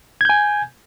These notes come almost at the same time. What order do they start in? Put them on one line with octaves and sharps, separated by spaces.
G#6 G6 G#5